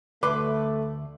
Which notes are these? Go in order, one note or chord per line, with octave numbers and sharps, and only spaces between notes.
D2 A3 B4 C6 D6